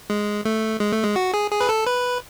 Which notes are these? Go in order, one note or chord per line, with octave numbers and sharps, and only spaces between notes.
G#3
A3
G#3
A3
G#3
F#4
G#4
G#4
B4
A4
B4